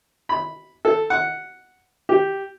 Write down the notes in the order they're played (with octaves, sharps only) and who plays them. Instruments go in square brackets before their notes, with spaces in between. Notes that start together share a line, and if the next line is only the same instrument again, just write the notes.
[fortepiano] B5
A4
F#5
G4